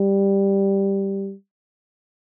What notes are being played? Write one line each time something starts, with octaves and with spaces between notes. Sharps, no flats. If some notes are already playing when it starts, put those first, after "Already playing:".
Already playing: G3